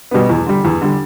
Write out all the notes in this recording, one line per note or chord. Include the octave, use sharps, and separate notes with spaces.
B2 G3 B3
E2
D3 G3
E2
D3 G3